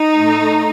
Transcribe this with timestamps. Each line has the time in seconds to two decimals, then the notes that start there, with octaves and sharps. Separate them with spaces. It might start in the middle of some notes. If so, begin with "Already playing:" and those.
Already playing: D#4
0.15 A2 A3